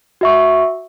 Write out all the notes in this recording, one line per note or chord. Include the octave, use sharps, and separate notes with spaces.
F#4 E5 C#6